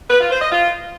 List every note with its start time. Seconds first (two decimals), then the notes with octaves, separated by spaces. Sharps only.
0.10 B4
0.21 F4
0.31 C5
0.42 D#5
0.52 F4